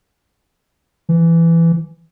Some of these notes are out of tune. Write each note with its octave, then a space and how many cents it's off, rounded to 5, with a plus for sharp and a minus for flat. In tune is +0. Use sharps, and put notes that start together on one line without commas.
E3 +15